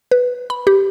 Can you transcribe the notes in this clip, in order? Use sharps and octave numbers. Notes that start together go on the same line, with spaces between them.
B4
B5
G4